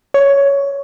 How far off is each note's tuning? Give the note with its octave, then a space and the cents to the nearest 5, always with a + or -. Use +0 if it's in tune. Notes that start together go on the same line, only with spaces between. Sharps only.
C#5 +10